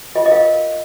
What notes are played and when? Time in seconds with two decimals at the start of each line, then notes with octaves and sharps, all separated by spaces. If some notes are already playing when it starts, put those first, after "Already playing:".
0.16 F4 D#5
0.26 D#5
0.31 A#4 F5